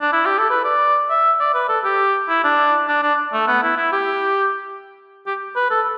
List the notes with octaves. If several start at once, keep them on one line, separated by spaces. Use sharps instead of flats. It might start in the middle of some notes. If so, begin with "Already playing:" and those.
D4
E4
G4
A4
B4
D5
E5
D5
B4
A4
G4
E4
D4
D4
D4
A3
B3
E4
E4
G4
G4
B4
A4